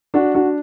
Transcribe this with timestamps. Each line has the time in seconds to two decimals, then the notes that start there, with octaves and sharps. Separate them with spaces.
0.14 D4 F#4
0.34 D4 F#4